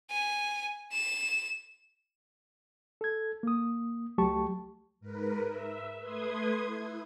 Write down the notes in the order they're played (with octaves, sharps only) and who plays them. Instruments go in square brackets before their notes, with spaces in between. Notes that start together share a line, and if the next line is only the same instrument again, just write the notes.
[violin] G#5
E7
[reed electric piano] A4 G#6
A#3 D#6
C#2 F#3 A3 G4 A5 C#6
[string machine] G#2 A#4 B4
E5
A3 B4 C6 D#6 G#6
E4